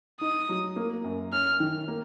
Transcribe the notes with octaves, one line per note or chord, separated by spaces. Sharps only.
D#4 D#6
F#3
A#3
F#2
C#4 F6
D#3
A#3